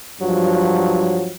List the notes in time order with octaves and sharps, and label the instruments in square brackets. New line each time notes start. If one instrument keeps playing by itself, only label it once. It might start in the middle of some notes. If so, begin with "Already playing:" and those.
[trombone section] G2 F3 F#3